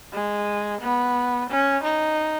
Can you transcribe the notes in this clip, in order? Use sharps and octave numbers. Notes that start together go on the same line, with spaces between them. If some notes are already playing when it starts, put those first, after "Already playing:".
G#3
B3
C#4
D#4